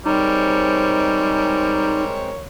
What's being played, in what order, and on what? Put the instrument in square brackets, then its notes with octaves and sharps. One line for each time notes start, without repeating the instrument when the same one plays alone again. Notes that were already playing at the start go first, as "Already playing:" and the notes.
[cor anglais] G3 [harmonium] G#3 C4 C5 [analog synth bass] D#4 [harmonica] A#4 C#5